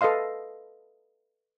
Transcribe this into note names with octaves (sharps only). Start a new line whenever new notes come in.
A4 B4 D#5 F5 C6